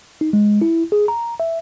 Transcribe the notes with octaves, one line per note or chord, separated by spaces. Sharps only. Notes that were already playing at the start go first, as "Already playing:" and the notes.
D#4
G#3
E4
G#4
A#5
E5